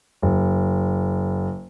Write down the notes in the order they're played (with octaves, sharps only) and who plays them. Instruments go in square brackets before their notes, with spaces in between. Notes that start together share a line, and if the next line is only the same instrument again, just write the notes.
[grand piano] F#1